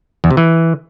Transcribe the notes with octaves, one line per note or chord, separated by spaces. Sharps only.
E2
C3
E3